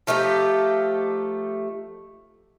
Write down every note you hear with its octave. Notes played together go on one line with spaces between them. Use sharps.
F3 A3 D#4 G4